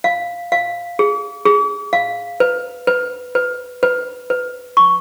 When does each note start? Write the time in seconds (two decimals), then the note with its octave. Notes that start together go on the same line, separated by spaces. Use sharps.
0.04 F5
0.52 F5
0.99 G#4
1.46 G#4
1.93 F5
2.40 B4
2.87 B4
3.35 B4
3.83 B4
4.30 B4
4.77 C#6